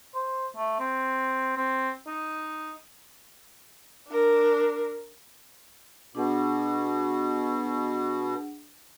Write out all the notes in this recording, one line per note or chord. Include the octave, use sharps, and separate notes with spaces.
C5
A3
C4
C4
D#4
D4 A#4
B2 D4 G#4 F#5